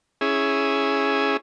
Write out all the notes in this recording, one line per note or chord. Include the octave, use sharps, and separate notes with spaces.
C#4 E4 G#4